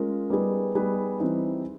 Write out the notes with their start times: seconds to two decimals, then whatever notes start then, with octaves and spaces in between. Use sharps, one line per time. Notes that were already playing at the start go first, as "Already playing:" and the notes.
Already playing: G#3 C#4 F4 A#4
0.30 G3 B3 D#4 G#4 B4
0.75 G3 B3 D#4 G#4 B4
1.20 E3 G3 C4 D#4